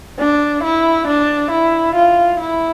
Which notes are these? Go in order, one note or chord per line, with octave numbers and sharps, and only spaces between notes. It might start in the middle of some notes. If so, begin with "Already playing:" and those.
D4
E4
D4
E4
F4
E4